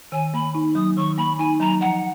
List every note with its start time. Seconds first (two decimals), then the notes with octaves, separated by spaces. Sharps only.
0.12 D#3 G#5
0.34 A#3 B5
0.55 D#4
0.75 F#3 D#6
0.97 D#3 C#6
1.18 A#3 B5
1.39 D#4 G#5
1.60 F#3 A#5
1.81 F3 F#5